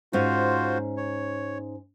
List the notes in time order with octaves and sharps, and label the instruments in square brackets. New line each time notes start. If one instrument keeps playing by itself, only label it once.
[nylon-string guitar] G#2 C#4 [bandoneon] F4 F#4 C5
[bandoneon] C#5